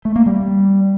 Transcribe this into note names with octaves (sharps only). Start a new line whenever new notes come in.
A3
A#3
G3